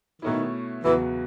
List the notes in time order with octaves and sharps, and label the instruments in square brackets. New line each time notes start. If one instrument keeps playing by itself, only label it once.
[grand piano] B2 A3 C#4 E4 [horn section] D#3
[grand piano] E2 C#3 F#3 B3 F#4 [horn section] E3